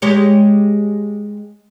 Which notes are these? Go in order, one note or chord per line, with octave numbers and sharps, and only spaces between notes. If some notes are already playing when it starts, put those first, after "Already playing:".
G#3 G4 C#5